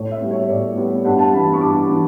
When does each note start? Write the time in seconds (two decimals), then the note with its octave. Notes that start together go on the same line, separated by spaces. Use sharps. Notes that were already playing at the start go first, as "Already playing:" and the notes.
Already playing: A2 C#5
0.11 E5
0.21 G3 B3
0.31 C#5
0.50 A2 D5
0.77 G3 B3
1.05 G2 F#5
1.19 A5
1.33 E3 B3 B5
1.54 C#6
1.61 G2 D6
1.89 E3